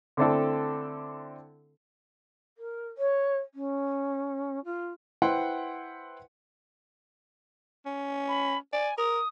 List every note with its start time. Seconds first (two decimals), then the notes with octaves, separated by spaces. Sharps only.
0.17 D3 A3 C4 D4 E4 A4
2.57 A#4
2.97 C#5
3.54 C#4
4.64 F4
5.22 E4 B4 C5 F#5 G5 C6
7.86 C#4
8.28 B5
8.73 D5 G#5
8.98 A#4 D#6